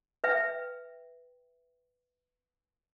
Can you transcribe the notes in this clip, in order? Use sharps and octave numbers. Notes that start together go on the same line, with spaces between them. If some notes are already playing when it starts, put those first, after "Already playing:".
B4 E5 G5